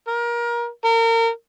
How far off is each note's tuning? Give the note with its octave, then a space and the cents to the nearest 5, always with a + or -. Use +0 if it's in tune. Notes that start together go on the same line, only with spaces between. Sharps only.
A#4 +25
A#4 -30